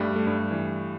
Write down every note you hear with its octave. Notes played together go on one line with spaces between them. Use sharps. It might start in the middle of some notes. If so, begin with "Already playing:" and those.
Already playing: G2 G3 A3
A3
G2 G3
E3